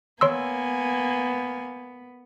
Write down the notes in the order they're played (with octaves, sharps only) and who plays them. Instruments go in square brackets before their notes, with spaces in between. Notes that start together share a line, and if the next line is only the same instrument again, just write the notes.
[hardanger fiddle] A#3 G#5 [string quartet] B3 [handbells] C#5 C6 E6